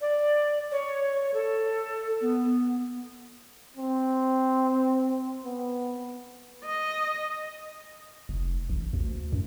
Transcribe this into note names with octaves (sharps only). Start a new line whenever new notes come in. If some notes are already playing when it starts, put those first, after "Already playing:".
D5
C#5
A4
B3
C4
B3
D#5
F1
A1
D2
F#2